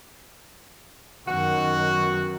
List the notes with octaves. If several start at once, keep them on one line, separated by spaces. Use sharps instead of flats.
F#2 B2 D#3 F#4